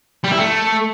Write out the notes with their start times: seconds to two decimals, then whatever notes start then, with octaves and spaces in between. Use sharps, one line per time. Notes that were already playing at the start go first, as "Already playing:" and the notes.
0.24 G3
0.31 E4
0.38 A3